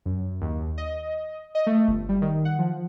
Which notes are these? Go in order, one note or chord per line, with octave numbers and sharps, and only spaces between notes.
F#2
D#2
D#5
D#5
A3
G1
G3
D#3
F#5
F3